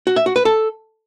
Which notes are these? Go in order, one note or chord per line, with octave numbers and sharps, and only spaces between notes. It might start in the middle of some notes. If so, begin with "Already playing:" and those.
F#4
E5
F#4
B4
A4